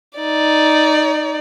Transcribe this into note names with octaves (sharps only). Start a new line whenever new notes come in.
D#4 D5